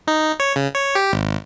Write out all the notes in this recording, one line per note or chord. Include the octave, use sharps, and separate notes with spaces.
D#4
C#5
C#3
C#5
G4
G#1